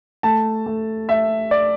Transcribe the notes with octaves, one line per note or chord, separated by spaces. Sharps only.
A3 A5
A3
A3 E5
D5